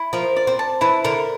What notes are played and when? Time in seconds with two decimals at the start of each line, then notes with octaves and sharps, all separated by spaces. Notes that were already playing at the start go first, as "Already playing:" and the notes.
Already playing: E4
0.13 F3 A#4
0.36 D5
0.47 C4
0.59 A5
0.81 E3 E4
1.04 D3 A#4